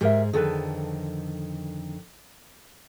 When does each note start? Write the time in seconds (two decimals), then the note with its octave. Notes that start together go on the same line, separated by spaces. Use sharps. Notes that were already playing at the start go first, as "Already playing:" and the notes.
0.01 G#2 G4 G#4 A#4 E5
0.33 F2 D3 D#3 G#4 A4 B4